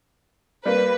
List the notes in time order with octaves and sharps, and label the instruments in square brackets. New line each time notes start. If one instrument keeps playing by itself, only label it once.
[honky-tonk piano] G3 A#3 [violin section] B4